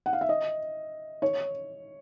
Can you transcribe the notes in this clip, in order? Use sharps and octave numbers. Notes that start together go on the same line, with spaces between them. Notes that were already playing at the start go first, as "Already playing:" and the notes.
F#5
F5
E5
D#5
C#5